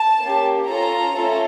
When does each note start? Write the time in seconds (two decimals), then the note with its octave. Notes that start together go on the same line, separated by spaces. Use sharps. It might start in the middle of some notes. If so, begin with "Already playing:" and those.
Already playing: A5
0.22 A#3 C#4 G4
0.69 C#4 F4 A4 A#5
1.15 A3 C#4 F4 A4